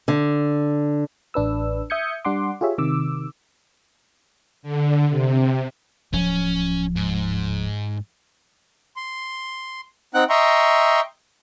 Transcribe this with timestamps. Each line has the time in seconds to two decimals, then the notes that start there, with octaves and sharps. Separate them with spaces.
0.08 D3
1.34 A1 D4 B4 E6
1.90 E5 D#6 G6 G#6 C#7
2.25 G3 D4 F#5 C6 D6
2.61 F4 G4 G#4 C#5 E5
2.78 C3 D#3 D6 E6
4.63 D3
5.10 C3
6.14 D1 F3 C#4
6.96 G#2
8.96 C6
10.14 C4 D#4 F#5 G5 F#6
10.29 D#5 E5 G5 A#5 C6 C#6